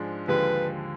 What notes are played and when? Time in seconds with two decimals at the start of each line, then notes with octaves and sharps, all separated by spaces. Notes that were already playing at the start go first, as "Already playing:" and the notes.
Already playing: G#2 F3 G#3 D4
0.28 D#2 D3 F3 G#3 B4